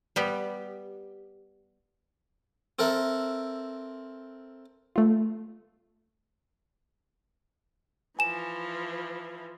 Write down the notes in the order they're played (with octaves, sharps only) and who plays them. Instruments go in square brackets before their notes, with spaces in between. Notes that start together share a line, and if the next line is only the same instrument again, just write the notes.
[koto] G3 B3 G4
[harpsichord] C4 A4 A#4 E5
[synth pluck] A3 F4
[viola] E3 F3 [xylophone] G#5 E7